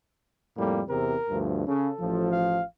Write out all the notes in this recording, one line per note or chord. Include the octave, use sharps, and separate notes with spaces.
F2 A2 G3 A#3
E2 C3 A#4
D2 G2 F3
C#3 A4
A1 F3
F5